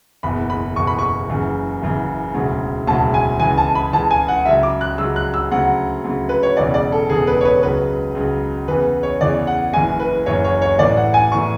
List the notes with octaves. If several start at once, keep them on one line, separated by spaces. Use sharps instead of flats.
F#1 E2 B2 B5
B5
F#1 E2 B2 C#6
B5
C#6
F#1 F#2 C#3 E3
F#1 F#2 C#3 E3
E1 D2 C#3 F#3
E1 D2 C#3 F#3 A5
G#5
C#2 C#3 E3 G#5
A5
B5
C#2 C#3 E3 A5
G#5
F#5
C#2 C#3 F#3 E5
D6
F#6
C#2 C#3 F#3 E6
F#6
E6
D2 C#3 F#3 F#5
D2 C#3 F#3
B4
C#5
E1 E2 C#3 E3 D5
D5
A4
E1 E2 C#3 E3 G#4
B4
C#5
B4
C#2 C#3 F#3 B4
C#2 C#3 F#3
E2 C#3 E3 B4
C#5
E2 C#3 E3 D5
F#5
F#1 F#2 E3 G#5
B4
F#1 F#2 E3 C#5
C#5
C#5
A1 A2 E3 D5
F#5
G#5
A1 A2 E3 C#6